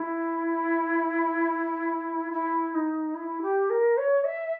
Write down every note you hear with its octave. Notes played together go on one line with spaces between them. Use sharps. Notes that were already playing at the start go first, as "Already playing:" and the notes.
Already playing: E4
E4
D#4
E4
G4
A#4
C#5
E5